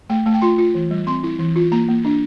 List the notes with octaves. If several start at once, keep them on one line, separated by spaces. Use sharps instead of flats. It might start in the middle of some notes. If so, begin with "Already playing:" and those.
A3 G5
A3 A5
G5
F4 C6
F4
E3
G3
C4 C6
E4
E3
F4
A#3 A#5
A#3
D4